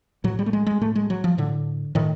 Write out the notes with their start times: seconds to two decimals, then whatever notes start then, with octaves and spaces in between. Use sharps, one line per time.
0.24 A2 F#3
0.39 G3
0.46 A3
0.53 G#3
0.67 G#3
0.81 A2 A3
0.95 G#3
1.10 F#3
1.24 F3
1.38 A2 D3
1.95 A2 D#3